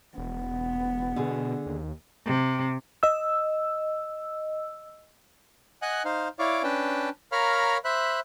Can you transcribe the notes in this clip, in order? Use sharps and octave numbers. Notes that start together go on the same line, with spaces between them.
E1 B3
B2 D3 G#4
D#2
C3
D#5 E6
D#5 F#5 G#5 F#6
D#4 C5 F5
E4 C#5 D5 F5 D6
C#4 D4 B4 G5 A5
A#4 C#5 F5 A#5 B5 F6
C5 E5 B5 F#6